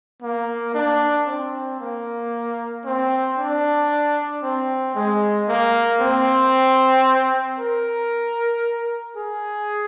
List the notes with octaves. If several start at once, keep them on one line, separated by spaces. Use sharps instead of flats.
A#3
D4
C4
A#3
C4
D4
C4
G#3
A#3
C4
A#4
G#4